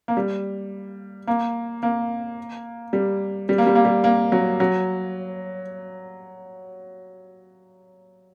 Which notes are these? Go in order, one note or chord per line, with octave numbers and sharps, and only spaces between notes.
A#3
G3
A#3
A#3
G3
G3
A#3
G3
A#3
G3
A#3
F#3
F#3